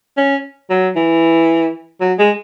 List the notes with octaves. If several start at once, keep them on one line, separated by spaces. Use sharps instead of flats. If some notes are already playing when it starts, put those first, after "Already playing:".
C#4
F#3
E3
F#3
G#3